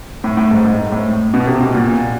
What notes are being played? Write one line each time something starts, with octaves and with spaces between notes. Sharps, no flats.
A2
A2
G#2
G#2
A2
B2
C3
B2
A#2